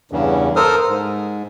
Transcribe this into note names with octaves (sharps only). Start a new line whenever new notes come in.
E2 G2 C#3
A4 A#4 C5 D#6 F6
G#2